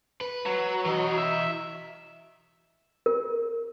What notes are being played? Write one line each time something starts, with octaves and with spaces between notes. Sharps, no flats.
B4
F#3
E3 D#5
E5
A#4